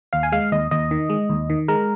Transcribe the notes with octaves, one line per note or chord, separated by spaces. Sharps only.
D#2 F5
G#5
G#3 F5
D#2 D#5
D#2 D#5
D#3
G#3
D#2
D#3
G#3 A#4